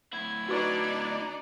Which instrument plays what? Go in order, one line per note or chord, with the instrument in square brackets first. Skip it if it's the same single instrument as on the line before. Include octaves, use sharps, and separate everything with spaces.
[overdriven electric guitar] D2 E4 [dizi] G#6
[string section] D4 D#4 D5 [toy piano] F#4 B4 C#6